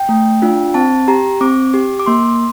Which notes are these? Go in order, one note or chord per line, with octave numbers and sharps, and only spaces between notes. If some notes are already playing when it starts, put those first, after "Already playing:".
Already playing: G5
A3
D4 F4
C4 A5
G4 A#5
C4 D6
G4
D6
A#3 C6